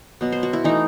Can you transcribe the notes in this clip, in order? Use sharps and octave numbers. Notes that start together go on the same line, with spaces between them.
B2 F#3 B3
C5
F#4
E4
E3 A3 D#4